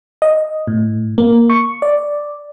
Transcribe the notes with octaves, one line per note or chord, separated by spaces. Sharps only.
D#5
A2
A#3
C#6
D5